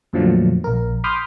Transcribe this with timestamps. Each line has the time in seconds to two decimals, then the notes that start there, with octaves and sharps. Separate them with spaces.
0.13 F2 A#2 D3 F3 F#3 A3
0.64 A#1 A#4
1.04 B5 C6 D6 D#6 F6 G6